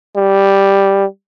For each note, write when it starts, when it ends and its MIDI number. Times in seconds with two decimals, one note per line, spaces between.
0.16 1.05 55